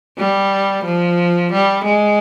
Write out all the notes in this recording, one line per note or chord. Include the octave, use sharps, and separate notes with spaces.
G3
F3
G3
G#3